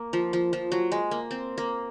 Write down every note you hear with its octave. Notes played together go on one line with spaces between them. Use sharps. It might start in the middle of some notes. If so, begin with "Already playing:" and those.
Already playing: A#3
F3
F3
F3
F#3
G#3
A#3
C4
A#3